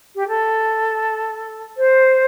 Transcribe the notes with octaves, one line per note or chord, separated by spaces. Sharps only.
G4
A4
C5